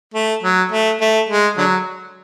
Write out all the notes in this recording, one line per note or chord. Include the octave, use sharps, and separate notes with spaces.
A3
F#3
A3
A3
G#3
D3 F#3